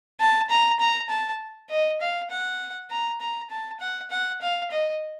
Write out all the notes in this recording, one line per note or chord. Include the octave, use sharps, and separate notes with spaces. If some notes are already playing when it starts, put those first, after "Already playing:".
A5
A#5
A#5
A5
D#5
F5
F#5
A#5
A#5
A5
F#5
F#5
F5
D#5